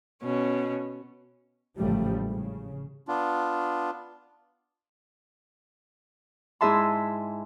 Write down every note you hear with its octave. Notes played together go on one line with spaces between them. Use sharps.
B2 C#4
A1 G#2 C#3 F3 G3 A3
C#3
B3 D4 F4
G#2 E4 G#4 E5 A5 C6